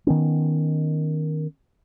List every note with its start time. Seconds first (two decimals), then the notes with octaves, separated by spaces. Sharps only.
0.07 D#3 B3 C#4